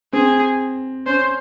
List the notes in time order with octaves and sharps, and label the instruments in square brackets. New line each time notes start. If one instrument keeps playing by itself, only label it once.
[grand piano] C4 [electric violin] G#4
[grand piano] C#4 [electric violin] C5